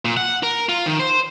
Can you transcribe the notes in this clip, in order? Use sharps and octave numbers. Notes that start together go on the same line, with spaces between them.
A#2
F#5
A#4
F4
D#3
C5